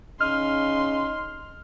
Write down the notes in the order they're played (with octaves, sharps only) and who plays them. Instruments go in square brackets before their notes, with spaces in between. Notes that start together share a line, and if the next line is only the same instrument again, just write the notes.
[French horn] C#3 [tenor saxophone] D#4 [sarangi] C6 [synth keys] F6